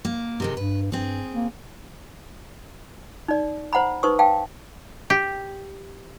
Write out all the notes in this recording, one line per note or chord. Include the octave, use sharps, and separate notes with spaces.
A#3
C3 D#3 G#3
G2 B4
G2 C4 G#4
A#3
D#4 D5
C5 F#5 A#5 B5
D#4 B4 C5 C#6 D#6
F5 G5 A5
G4